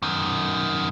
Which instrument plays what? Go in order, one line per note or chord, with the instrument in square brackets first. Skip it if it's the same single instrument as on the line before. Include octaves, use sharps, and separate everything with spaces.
[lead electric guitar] F#2 D#3